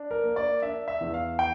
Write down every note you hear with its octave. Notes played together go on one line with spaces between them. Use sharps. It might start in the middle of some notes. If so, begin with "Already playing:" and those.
Already playing: D4
A#4
A#3
D5
D4 E5
E5
E2
F5
G5